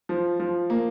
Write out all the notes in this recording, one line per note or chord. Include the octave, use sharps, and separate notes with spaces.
F3
F3
A#3